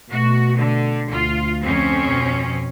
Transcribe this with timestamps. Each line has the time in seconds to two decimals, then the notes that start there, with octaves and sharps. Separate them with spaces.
0.11 B2 A3 F#4
0.57 D3
1.10 D2 F4
1.62 F2 C4 C#4
2.04 B2